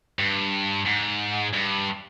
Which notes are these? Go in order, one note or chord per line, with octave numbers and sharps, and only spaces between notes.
G2
G#2
G2